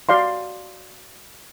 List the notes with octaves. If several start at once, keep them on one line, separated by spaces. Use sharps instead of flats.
F#4 D5 F5 C6